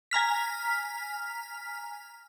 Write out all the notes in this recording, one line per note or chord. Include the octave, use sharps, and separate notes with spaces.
G#5 A#5 F6 B6